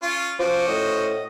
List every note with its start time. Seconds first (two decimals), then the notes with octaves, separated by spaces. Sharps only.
0.02 C#4 F4 C6
0.39 F3 C#4 F#4 C5 D6
0.68 A2 D#5